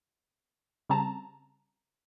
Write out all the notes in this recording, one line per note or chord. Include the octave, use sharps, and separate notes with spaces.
C#3 G3 C4 A5 A#5